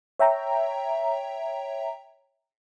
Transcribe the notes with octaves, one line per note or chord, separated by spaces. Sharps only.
C#5 E5 G5 A#5